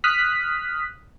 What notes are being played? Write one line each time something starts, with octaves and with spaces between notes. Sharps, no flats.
D#6 F6 F#6 B6